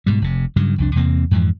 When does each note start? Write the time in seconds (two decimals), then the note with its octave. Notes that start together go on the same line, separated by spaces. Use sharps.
0.06 G#2 B2 G3
0.22 F1 C3
0.56 G2 C#3 F#3
0.78 C2 F2 D4
0.95 E2 C3 A#3 C4
1.31 F2 G#2 E3 F3